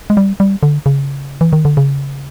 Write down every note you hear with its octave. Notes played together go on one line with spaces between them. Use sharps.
G#3
G3
G3
D3
C#3
E3
D#3
D3
C#3